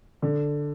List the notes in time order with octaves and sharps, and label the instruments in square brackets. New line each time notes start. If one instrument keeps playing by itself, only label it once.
[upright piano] D3